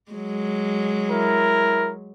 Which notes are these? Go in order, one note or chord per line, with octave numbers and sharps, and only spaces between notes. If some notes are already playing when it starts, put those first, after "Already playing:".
F#3 G#3
E4 A#4